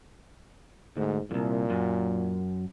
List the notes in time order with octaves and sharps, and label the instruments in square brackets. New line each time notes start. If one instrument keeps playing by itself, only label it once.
[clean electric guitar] D2 [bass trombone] G#2
[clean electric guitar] C2 F2 [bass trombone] A#2
[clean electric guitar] F#2